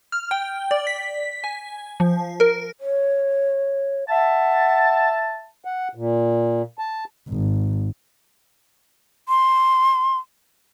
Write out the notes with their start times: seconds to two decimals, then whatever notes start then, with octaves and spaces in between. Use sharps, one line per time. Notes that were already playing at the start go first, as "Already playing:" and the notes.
0.12 F6
0.31 G5
0.71 D5
0.87 B6
1.44 G#5
2.00 F3
2.40 A#4
2.80 C#5
4.09 E5 F#5 A5
5.65 F#5
5.95 A#2
6.79 A5
7.29 G#1
9.29 C6